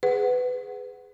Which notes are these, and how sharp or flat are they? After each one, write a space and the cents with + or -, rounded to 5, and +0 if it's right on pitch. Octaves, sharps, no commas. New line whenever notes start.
G#4 +0 B4 +20 F#5 +10